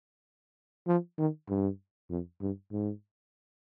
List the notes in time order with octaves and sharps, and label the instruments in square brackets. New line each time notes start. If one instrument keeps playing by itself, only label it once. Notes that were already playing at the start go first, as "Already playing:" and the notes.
[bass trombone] F3
D#3
G2
F2
G2
G#2